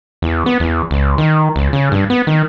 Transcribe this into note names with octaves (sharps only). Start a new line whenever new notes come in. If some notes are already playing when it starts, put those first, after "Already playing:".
E2
B3
E2
C#2
D#3
C#2
C#3
G2
B3
D#3